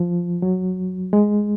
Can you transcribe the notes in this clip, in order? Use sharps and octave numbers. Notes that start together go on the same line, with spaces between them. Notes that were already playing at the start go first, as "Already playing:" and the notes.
Already playing: F3
F#3
G#3